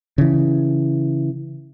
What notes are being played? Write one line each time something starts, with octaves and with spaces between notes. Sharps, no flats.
C#3 E3